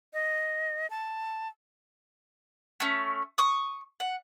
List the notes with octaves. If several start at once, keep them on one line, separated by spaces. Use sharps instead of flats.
D#5
A5
A3 C#4
C#6 D#6
F#5